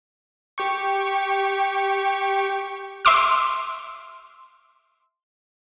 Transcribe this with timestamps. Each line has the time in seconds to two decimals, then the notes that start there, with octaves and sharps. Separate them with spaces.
0.58 G4 G5 C#6
3.05 E5 C6 D6 F6